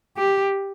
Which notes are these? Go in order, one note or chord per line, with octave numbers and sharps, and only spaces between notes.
G4